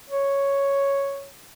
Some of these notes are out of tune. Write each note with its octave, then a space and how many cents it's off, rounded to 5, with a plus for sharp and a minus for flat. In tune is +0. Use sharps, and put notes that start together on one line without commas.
C#5 +0